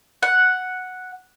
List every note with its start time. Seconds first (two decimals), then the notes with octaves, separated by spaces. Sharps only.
0.23 F#5